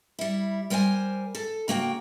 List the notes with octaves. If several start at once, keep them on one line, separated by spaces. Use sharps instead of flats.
G3 E4
G3 A#4 C5 F5 G#5
A4
C#3 A#3 F#4 G5